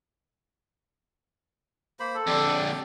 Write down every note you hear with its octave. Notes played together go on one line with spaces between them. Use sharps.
A#3 C5 B5
A4
F2 D3 G4 D5